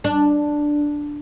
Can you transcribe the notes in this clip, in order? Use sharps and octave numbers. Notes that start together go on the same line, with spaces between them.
D4